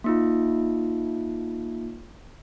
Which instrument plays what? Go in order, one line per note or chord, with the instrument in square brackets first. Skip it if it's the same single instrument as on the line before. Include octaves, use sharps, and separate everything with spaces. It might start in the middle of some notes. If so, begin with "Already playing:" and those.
[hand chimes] A#3 D#4 F4